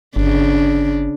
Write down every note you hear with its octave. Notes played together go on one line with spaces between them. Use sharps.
G1 C#3 D4